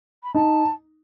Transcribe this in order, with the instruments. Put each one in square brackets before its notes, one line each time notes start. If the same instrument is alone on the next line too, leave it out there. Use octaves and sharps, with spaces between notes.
[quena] B5
[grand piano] D#4 [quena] A5